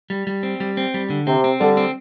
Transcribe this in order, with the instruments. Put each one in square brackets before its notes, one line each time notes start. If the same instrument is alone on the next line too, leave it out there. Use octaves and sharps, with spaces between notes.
[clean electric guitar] G3
G3
C4
G3
C4
G3
D3
[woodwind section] C3 [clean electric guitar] C4
[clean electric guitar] C4
[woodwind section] D3 [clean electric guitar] G3
[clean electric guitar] C4